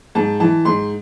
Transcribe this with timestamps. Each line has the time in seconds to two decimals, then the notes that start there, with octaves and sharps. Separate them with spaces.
0.15 G#2 A5
0.40 E3 A5
0.65 G#2 C6